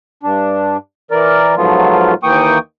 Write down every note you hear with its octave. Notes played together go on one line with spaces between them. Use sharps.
G2 D4
E3 A#4 D5
G#2 F3 F#3 A3 B3 F4
D#2 E3 A#3 G5 C#6 D#6